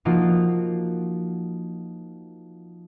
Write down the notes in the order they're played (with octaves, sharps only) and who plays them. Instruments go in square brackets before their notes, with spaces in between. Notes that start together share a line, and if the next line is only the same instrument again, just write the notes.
[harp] F3 A#3 D#4 F4 F#4